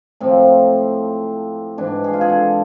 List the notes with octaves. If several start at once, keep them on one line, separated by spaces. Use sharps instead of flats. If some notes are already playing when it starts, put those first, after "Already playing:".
A2 F3 C4
G#2 E3 D4
G#4
F4
G#4
A4